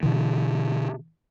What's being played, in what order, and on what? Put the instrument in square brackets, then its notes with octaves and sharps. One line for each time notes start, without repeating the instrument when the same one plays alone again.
[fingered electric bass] B2 D3 E3